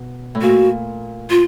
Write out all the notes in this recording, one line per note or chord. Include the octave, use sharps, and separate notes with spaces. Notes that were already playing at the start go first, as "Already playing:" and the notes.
Already playing: B2
A2
A#2 F#4
F4